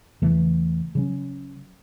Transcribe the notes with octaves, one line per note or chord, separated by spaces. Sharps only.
E2 C#3 E3 A3
C#3 F#3 C#4